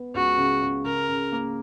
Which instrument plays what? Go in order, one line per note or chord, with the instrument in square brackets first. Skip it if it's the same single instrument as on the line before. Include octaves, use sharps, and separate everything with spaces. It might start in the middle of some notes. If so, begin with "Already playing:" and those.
Already playing: [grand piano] B3
[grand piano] C#2 [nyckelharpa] F#4
[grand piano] C#3
C#3
[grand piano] C#3 [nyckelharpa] A#4
[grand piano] C#3
A#3